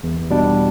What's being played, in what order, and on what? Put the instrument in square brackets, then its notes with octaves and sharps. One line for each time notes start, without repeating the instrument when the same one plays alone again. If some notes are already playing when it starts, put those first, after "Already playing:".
[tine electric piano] E2
B2 G3 D4